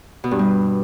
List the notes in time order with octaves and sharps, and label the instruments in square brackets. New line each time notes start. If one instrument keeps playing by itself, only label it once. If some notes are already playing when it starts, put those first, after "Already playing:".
[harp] B2
G2
G3